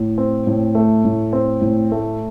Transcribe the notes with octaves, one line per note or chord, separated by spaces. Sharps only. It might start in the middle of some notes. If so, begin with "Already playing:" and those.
Already playing: A2
C4
A2
A3
A2
C4
A2
A3